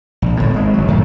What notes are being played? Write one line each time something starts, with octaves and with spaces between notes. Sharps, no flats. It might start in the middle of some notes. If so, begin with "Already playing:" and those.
A#1
G1 A2
G#1 G#3
G1 F#3
F#2 A2 D#3 A3